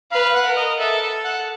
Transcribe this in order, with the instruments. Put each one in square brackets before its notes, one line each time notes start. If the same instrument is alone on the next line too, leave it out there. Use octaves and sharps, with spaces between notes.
[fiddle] B4 [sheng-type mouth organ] F5
[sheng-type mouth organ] F#5
[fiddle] A#4
[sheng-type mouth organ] D#5
[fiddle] A4 [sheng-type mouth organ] E5
[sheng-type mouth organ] F#5